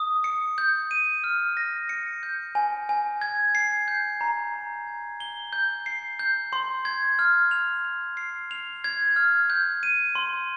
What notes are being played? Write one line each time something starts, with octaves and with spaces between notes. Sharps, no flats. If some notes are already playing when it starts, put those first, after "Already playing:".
Already playing: D#6
C#7
G6
D#7
F6
A#6
C#7
G6
G#5
G#5
G#6
C7
G6
A#5
A#5
G#6
G7
G6
C7
G6
C6
G#6
F6
F7
F7
C7
F7
G#6
F6
G6
D#7
C6